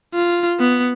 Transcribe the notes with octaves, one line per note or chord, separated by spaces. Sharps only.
F4
B3